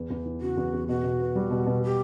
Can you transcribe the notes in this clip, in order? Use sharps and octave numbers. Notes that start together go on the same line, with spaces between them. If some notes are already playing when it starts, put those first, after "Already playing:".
Already playing: E2
E2
E3
C#3 F#4
E2
E2
B2 F#4
B2
B3
G3
B2
B2
G4